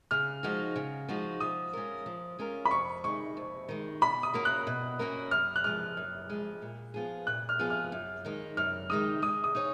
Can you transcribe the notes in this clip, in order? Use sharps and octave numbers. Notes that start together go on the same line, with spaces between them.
C#3 F6
F3 G#3 D#4 F#4
C#3
F3 G#3 D#4 F#4
F3 D#6
G#3 C#4 F4 A#4
F3
G#3 C#4 F4 A#4
B5
F2 C#6
D#3 G#3 C#6
F2
D#3 G#3
B2 B5
D#6
A#3 C#4 F#4 A#4
F#6
B2
A#3 C#4 F#4 A#4
F#2 F6
F#6
F3 G#3 F6
F#2
F3 G#3
A#2
F3 B3 F4 G#4
A#2 F#6
F6
F3 B3 F4 G#4
F6
F#2
D#3 G#3 D#4
F#2 F6
D#3 G#3 D#4 D#6
G#3 D#6
D#6
D#4 G#4 C#5